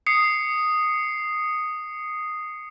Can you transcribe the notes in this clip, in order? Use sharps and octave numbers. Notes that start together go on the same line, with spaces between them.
D#6 C7 C#7